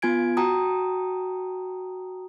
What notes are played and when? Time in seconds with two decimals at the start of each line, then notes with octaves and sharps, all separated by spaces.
0.02 B3 F4 G#5 G#6 D7
0.37 F#4 G5 A5 A#5 D#6